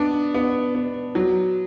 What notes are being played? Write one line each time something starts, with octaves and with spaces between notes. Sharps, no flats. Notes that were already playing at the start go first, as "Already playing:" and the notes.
Already playing: B3 D4
B3
B3
F#3